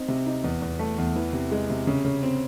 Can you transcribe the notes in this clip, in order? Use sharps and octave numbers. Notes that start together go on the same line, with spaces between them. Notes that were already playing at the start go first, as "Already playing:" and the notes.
Already playing: C4 D#4
C3
D#4
E2
E2
A3
E2
E3
C3
G#3
C3
C#3
C#3
C4